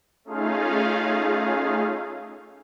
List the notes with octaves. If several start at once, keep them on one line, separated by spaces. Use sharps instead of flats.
A3 C#4 D#4 F4 G#4 F5